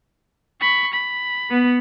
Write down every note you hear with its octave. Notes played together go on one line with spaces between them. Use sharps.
B5 C#6
B5
B3